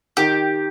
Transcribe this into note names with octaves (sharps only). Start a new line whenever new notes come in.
D#3 G4